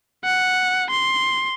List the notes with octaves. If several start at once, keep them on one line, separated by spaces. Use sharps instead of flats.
F#5
C6